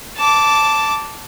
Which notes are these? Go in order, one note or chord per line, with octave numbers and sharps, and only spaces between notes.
A5 D6